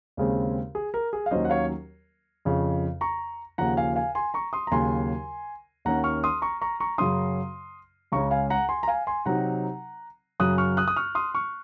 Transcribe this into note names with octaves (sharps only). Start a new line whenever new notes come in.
D#2 C#3 G#3 C4
G#4
A#4
G#4
F5
D#2 D#3 F#3 C#4 C5 D#5
F#5
C#5 F5
F2 C#3 F3
A#5 C#6
D#2 C#3 F3 F#5 A#5
F5 G#5
F5 G#5
G#5 C6
A#5 C#6
C6 D#6
A#5
D#2 C#3 F#3 G#5 C6
D#2 D#3 A#3 C#4 F#5 A#5
C#6 F6
C6 D#6
A#5 C#6
A#5 C#6
A#5 C#6
F#2 C#3 F#3 C#4 C6 D#6
C#2 C#3 G#3 C#4 A#5 C#6
F5 G#5
F#5 A#5
G#5 C6
A#5
F5 G#5
G#5 C6
C3 F#3 C4 D#4 F#5 A#5
F#2 C#3 F#3 D#6 F#6
C#6 F6
D#6 F#6
D#6
C#6 F6
C6 D#6
C#6 F6